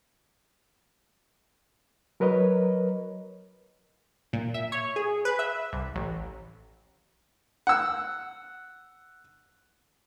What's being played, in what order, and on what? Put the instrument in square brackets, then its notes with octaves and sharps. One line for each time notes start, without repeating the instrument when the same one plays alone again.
[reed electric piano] F#3 A#4 B4 C#5 D#5
[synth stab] A#2
E5
C#5
G#4
B4
E5
C2
A1
[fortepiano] F#5 E6